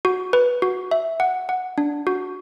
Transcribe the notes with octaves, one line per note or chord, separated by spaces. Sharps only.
F#4
B4
F#4
E5
F#5
F#5
D4
F#4